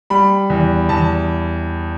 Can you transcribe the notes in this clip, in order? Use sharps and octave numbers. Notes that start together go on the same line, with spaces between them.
G3 B5
E2
E2 A5